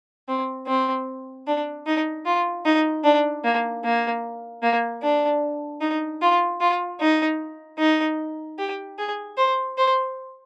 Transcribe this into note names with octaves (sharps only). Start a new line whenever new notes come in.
C4
C4
D4
D#4
F4
D#4
D4
A#3
A#3
A#3
D4
D#4
F4
F4
D#4
D#4
G4
G#4
C5
C5